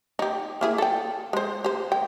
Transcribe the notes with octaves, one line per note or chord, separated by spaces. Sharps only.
D#4 G4
A#3 E4 G#4
A4 G5
G#3 C5
G4 C5
G5